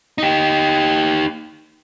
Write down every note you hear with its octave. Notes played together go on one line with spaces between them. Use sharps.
D#4 G4